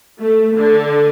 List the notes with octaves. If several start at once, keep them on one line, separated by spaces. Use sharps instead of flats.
A3
D3